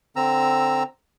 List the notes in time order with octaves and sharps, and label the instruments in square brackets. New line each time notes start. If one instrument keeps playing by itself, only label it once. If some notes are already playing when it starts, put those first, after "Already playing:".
[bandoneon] D3 C4 A#5 E6